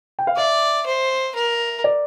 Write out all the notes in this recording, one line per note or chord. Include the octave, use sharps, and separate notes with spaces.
G5
F5
D5 E5
C5
A#4
D5